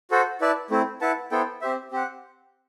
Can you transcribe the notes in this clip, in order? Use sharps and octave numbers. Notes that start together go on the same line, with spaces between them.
F#4 A4 C5 F#5
E4 B4 D5 A5
A3 C4 E4
E4 B4 F#5 A5
B3 E4 A4 C5 G5
C4 G4 C5 E5
C4 G4 C5 F#5